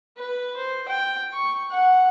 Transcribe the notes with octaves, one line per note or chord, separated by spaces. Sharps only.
B4
C5
G5
C#6
F#5